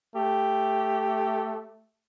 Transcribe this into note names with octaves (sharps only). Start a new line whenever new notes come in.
A3 G4